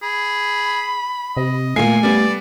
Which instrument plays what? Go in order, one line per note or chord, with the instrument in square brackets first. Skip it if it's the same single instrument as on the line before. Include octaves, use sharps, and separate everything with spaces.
[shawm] G#4 [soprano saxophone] B5
[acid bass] C3 [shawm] D#5
[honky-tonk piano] A#2 F4 C7 [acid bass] A3 [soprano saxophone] G#5
[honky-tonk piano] G3 B3 [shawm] D5